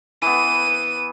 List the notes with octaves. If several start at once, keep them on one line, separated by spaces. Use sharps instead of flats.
E3 B3 D#7